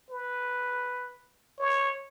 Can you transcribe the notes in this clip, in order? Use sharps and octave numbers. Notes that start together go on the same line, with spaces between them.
B4
C#5